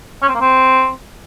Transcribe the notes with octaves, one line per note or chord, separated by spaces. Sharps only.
C#4
C4
A#3
C4